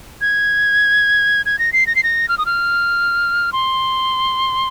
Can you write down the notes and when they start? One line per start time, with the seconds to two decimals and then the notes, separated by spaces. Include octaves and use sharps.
0.21 G#6
1.46 G#6
1.59 A#6
1.73 C7
1.87 A#6
1.96 C7
2.03 A#6
2.29 F6
2.38 D#6
2.46 F6
3.53 C6